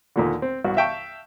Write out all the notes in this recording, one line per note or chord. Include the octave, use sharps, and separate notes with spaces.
D#2 A#2 D3
C4
C2 G2 F#4
E5 F5 G5 A5 C#6